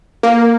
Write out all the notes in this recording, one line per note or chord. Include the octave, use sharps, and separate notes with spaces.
A#3